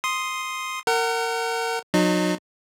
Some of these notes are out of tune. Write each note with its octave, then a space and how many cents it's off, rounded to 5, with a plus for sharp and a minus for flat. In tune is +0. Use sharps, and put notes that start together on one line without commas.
C6 +0 D#6 +0
A#4 -25 F#5 +20
F#3 -35 D#4 -35